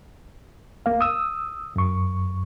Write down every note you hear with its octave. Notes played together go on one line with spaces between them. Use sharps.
C2 A#3 F5
D#6 E6
F#2 C#6